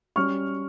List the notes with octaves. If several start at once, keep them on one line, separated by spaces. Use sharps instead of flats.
G3 C#4 C#6 F6